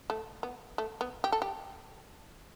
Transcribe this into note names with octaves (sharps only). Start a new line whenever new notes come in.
A3
B3
A3
B3
G4
A4
G4